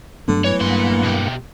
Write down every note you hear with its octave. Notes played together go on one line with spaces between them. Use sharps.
G2 D3 F#3 A3 B3
E3 C#5
G2 A#2 A#3 F#5 C6
B2 G4